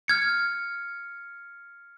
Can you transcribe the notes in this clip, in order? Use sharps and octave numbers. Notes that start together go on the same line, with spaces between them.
F6 G#6 C#7